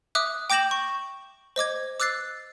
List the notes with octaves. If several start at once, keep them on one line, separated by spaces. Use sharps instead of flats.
E5 D6 D#6 F#6
G5 D6 G6 A#6 E7 F#7
C#6
C5 D#5 D6 G#6
D6 E6 F#6 A6 C7